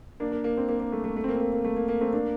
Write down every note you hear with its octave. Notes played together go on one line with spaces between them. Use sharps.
A#3 D4
A#3
A#3
C4
A#3
A#3
A3
A3
A3
C4
A#3
C4
A#3
A#3
A3
A#3
A#3
A3 C4
A#3 D4